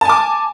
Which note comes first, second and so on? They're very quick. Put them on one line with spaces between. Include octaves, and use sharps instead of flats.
A5 G#5 D6